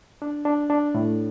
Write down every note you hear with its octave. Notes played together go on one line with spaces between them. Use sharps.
D4
D4
D4
A2